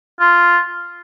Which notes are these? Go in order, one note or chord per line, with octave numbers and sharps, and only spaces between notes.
F4